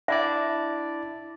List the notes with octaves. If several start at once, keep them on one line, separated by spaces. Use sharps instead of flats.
D4 E4 D5 E5